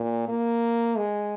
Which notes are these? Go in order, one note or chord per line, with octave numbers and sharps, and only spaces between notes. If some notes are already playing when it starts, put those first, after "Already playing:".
Already playing: A#2
A#3
G#3